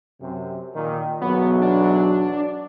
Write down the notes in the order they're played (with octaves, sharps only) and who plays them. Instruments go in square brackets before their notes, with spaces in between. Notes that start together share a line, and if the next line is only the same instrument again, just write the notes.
[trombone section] F#2 C3
A#2 D#3
[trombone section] B1 E2 F#3 [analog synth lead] B3
[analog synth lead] D4